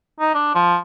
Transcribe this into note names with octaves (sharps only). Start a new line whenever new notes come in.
D#4
D4
F3